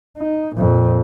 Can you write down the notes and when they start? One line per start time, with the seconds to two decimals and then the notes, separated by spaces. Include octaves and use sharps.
0.18 D#4
0.56 F2 A#2